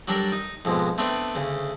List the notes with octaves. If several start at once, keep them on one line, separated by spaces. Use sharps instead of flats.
F#3 G3 D4 A4 A#4
D#4
F2 G#2 B2
A3 B3 C4 D4
D2 C#3